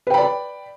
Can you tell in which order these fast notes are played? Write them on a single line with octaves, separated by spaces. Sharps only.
B4 G5 B5 D5